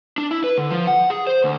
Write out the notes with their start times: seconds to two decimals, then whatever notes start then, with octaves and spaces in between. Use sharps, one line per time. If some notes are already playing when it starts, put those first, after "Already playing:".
0.18 D4
0.31 E4
0.44 B4
0.58 D3
0.70 F3
0.87 F#5
1.10 G#4
1.27 C5
1.44 D2